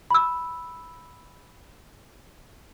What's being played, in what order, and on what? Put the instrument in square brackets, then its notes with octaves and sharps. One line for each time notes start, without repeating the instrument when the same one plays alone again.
[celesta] B5 E6